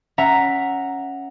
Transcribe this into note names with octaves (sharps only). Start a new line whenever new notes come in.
C#4 E5 F#5 A#5